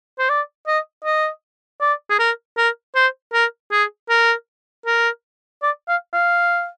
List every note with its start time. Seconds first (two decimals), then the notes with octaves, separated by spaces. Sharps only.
0.19 C5
0.29 D5
0.67 D#5
1.05 D#5
1.81 D5
2.10 G#4
2.19 A#4
2.57 A#4
2.95 C5
3.33 A#4
3.72 G#4
4.09 A#4
4.86 A#4
5.62 D5
5.88 F5
6.13 F5